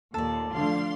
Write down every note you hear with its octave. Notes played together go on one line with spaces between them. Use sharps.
D#2 A#2 A4 D5
D3 F3 A3 D4 F5 C6